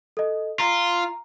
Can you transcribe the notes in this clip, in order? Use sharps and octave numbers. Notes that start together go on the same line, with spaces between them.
A4 D#5
F4 A#5